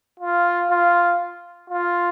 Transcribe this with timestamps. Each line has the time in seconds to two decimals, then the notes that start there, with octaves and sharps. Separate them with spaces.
0.20 F4
0.70 F4
1.70 F4